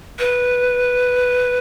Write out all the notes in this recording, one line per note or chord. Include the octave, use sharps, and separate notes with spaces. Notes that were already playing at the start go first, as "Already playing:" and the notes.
B4